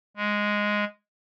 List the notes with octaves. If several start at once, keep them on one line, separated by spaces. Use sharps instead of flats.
G#3